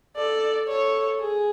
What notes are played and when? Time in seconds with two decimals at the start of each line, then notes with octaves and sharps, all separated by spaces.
0.17 A4 D5
0.69 A4 C#5
1.21 G#4